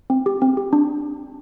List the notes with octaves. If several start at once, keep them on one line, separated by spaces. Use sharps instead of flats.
C4
G4
C4
G4
D4